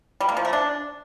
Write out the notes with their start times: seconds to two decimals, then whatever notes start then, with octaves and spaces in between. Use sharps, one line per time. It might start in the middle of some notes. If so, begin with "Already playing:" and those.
0.20 G3
0.29 A#3
0.37 F3
0.45 A3
0.53 D4